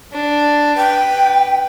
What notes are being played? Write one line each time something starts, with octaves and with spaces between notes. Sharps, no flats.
D4
B4 G5